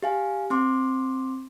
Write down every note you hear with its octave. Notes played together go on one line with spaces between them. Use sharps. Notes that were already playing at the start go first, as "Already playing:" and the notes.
G4 F5 G#5
C4 C6 D6